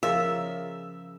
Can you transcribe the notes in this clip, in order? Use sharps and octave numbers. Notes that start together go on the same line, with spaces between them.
C#3 F3 F4 G#4 A#4 D#5 E5 E6